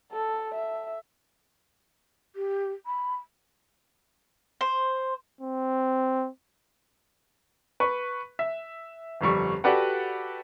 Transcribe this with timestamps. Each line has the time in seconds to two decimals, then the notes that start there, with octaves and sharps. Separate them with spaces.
0.12 A4
0.54 E5
2.36 G4
2.86 B5
4.61 C5
5.41 C4
7.80 B4 C#6
8.39 E5
9.21 G1 F2 G3 C#6
9.64 F#4 G4 A4 B4 D5 F#5